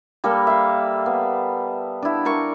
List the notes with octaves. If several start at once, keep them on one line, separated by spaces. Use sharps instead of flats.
G3 A#3 A4
E5 F5
B3
D4 E4
A#4 D5 C#6